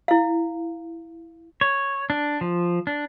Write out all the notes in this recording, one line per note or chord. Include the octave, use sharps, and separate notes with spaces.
E4 F5
C#5
D4
F3
D4